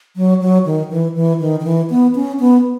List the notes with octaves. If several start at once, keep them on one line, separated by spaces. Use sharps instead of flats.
F#3
F#3
D#3
E3
E3
D#3
D#3
E3
B3
C#4
B3